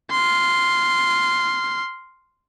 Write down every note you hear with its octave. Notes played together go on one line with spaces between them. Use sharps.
C6 F6